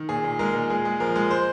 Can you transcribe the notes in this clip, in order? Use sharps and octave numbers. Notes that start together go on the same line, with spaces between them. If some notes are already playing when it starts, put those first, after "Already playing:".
Already playing: D#3
A#2 G#4
A#2
G#3 A#4
A#2
G#3 G#4
G#3
F3 A#4
G#3
C5